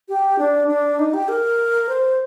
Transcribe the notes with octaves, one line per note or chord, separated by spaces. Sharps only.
G4
D4
D4
D#4
G4
A#4
C5